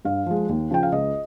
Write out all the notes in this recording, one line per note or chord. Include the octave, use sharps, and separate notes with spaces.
G2 F5
F3 G#3
D#2
C#3 F3 G5
F5
C#2 D#5